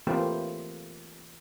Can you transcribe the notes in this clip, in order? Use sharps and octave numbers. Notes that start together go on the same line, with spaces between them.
E3 A3 A#3 C4 F4 G4